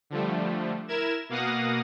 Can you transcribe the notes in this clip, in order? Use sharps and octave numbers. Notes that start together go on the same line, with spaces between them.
D3 F3 G3 A3
E4 A#4 G#6 E7
B2 A#3 F5 F#5 D#6 A#6